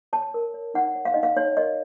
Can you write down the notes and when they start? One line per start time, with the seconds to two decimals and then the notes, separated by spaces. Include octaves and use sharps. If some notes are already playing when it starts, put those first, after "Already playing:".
0.13 C#5 A5
0.34 A#4
0.54 C#5
0.74 D#4 F#5
0.95 C#5
1.05 F5
1.14 D#4 D#5
1.23 F5
1.36 D#4 C#5
1.57 A#4 D#5